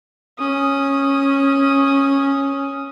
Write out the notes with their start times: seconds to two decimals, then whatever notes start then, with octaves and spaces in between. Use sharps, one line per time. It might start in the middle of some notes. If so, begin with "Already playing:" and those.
0.39 C#4 D#6